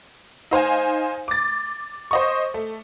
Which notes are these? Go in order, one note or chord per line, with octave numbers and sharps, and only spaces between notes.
D#4 C5 F5 G#5
D6 A6
C5 D#5 C#6
A3